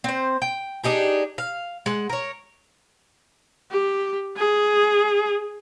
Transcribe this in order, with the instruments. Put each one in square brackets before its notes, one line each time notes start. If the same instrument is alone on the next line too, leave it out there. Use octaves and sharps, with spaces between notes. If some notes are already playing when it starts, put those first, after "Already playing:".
[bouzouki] C4 C5
G5
D4 D#4 G4 G#4
F5
G#3 F#5
A#4 C#5
[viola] G4
G#4